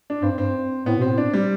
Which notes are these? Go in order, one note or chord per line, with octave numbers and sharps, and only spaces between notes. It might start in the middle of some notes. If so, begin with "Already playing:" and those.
D4
G2 C4
G2 C4
A2 B3
B2 C4
A2
D4
G3